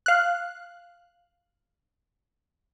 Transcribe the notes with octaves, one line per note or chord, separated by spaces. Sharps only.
F5 F#6